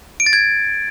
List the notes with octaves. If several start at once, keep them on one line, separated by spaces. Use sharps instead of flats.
D7
A6
G#6